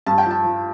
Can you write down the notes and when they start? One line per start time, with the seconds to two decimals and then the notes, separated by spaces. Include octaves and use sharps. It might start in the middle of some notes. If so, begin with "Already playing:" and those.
0.06 G2 A5
0.18 G5
0.25 F3
0.31 A5
0.44 F3